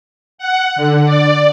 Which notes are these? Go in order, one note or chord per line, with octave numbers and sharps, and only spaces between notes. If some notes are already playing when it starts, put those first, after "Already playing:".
F#5
D3
D5